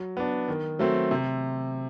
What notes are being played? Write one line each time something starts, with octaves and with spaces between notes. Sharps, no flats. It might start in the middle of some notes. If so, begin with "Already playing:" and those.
Already playing: F#3
B3 D4
D#3
F#3 A3 C4
C3